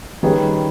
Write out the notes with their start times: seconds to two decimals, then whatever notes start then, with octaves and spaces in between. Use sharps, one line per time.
0.23 D#3 G3 C#4 G#4 B4